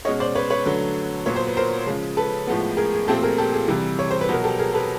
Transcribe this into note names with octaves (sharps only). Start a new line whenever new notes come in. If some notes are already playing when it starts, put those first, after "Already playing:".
B2 G#3 C#4 C#5 D#5
C5 D5
B4 C#5
B4 C#5
D3 F#3 A3
A#2 F#3 B3 C#5
C5
B4
A#4 C5
C#3 F3 G#3
A4 B4
A2 F3 G#3 B3
G#4 A#4
G#4
A#2 F3 A3 C4 G4 A4
G#4 A#4
G4 A4
G#4
C3 E3 G3
C#5
C5
B4
B2 F#3 B3 A#4
G4 A4
G#4 A#4
A4 B4